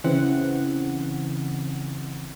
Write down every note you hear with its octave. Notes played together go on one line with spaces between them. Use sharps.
C#3 E3 C4 F#5